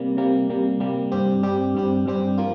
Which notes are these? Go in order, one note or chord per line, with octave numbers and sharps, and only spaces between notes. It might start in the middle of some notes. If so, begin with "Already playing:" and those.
Already playing: C3 G3 A#3
C3 G3 A#3
C3 G3 A#3
C3 G3 A#3
G2 G3 C4 G4
G2 G3 C4 G4
G2 G3 C4 G4
G2 G3 C4 G4
F3 A#3 F4